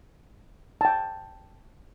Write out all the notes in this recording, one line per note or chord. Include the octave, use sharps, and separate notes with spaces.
G5 A5